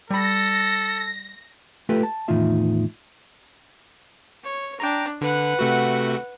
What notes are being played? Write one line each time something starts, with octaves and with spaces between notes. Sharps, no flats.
G3 A4 B5 A#6
A3 F4 G4 A4 B4
A5
E2 A2 D#3 D#4 F4 E5
C#5
D4 G5 A#5
D3 B4 F#5
C3 A3 F#4